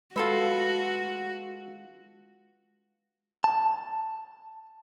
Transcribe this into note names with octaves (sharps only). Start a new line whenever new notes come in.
G#3 F4 F#4 A4 B4 E5 A5
A5